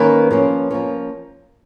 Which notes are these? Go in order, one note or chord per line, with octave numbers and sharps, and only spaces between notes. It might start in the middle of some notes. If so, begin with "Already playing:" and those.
Already playing: D#3 A#3 C#4 B4
F3 A#3 C#4
F3 A#3 C#4